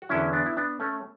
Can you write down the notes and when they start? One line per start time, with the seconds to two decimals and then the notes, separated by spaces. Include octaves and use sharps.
0.02 F#4
0.09 E2 D3 F#3 C#4 E4
0.33 B3 D4
0.46 E4
0.57 B3 D4
0.80 A3 C#4